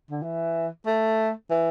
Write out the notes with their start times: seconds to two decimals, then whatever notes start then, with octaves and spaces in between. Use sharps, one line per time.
0.11 D3
0.23 E3
0.86 A3
1.50 E3